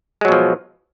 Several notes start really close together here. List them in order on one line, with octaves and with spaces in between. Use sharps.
G#3 F#3 B2 F3